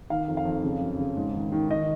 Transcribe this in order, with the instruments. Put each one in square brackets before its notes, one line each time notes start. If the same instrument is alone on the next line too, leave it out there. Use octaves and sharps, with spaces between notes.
[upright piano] D#3 F5
F2
F5
F2
C#3
F#2
C#3
G#2
D#3
D#3
D#3 D#5